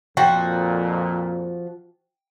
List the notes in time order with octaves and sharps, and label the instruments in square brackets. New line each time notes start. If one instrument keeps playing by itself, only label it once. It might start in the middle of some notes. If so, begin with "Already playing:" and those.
[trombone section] F2 A#2 [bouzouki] F3 F#4 [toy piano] F#5 G5